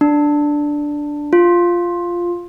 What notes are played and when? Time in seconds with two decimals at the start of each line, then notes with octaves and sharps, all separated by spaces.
0.01 D4
1.33 F4